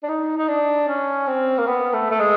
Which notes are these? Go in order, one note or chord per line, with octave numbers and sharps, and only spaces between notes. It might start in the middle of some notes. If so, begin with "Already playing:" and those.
D4
D#4
D#4
D4
C#4
C4
A#3
B3
A3
A3
G#3